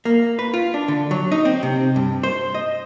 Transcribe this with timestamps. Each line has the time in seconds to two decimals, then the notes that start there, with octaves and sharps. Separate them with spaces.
0.05 A#3
0.39 B4
0.54 F4
0.74 D4
0.88 D3
1.11 F#3
1.32 D#4
1.45 C4
1.63 C3
1.96 G2
2.23 C5
2.55 D#5